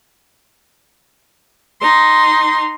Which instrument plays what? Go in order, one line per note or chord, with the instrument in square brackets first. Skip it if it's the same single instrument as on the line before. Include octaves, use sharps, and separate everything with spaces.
[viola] D#4 C6